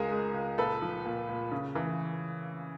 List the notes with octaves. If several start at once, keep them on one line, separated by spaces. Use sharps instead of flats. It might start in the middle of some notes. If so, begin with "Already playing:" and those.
Already playing: C#2 G#3 G#4 A#4
G#3
C#2
A#2 A4 B4
F3
A#2
A#2
C#3
E3